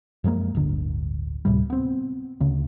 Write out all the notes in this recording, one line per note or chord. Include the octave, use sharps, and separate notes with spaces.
F#2 F3 G#3 A#3
D1 G1 D3
D2 A2 C3 G3
B3 C4
D2 C#3